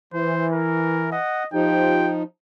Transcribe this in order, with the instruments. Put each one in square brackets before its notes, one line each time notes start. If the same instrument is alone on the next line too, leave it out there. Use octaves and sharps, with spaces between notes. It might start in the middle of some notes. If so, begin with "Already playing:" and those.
[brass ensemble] E3 [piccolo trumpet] C5
[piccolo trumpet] A#4
[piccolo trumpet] D#5 [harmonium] F#5
[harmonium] F3 D#4 [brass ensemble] F4 G4 C5 [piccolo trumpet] G5